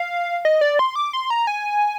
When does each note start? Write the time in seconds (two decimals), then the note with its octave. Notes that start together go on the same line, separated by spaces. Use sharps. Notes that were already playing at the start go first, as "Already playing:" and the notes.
Already playing: F5
0.45 D#5
0.61 D5
0.79 C6
0.96 D6
1.13 C6
1.30 A#5
1.47 G#5